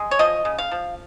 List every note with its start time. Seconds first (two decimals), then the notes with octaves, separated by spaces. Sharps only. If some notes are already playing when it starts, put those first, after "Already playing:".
Already playing: G#3
0.11 C#5
0.19 F3 D#5
0.45 C#3
0.58 F5
0.71 F3